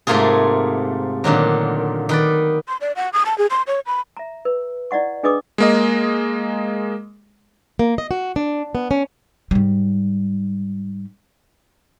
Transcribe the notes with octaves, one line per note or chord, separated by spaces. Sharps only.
G#2 C3 A3 A#3 F4 G#4
A#2 D3 D#3 F#3
D#3 B4 D5
C6
D5
F#5
D#6
A5
G#4
C6
C#5
B5
E5 A#5
B4
E4 D5 D#5 F#5 C#6
D4 G#4 B4 D#5 D6 D#6
G#3 A#3 D#5
A#3
D#5
F#4
D4
B3
C#4
G#2 G3